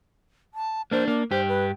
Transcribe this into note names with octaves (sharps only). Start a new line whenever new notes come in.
A5
A#3 D4 C5
A#3 D4
G2 G4 C5
B4